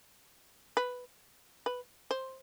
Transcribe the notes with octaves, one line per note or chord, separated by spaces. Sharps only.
B4
B4
C5